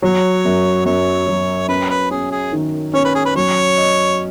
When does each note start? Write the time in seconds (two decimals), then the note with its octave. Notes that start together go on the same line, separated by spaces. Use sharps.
0.02 F#3 C#5
0.45 F#2
0.85 F#2 C#5
1.27 F#3
1.69 C#4 B4
1.90 B4
2.11 C#4 G#4
2.31 G#4
2.52 D#3
2.94 C#4 C#5
3.05 B4
3.15 G#4
3.25 B4
3.35 F#3 C#5
3.78 D#5